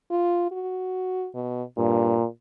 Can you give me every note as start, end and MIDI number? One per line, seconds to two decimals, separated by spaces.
0.11 0.48 65
0.51 1.28 66
1.35 1.63 47
1.78 2.17 43
1.78 2.27 46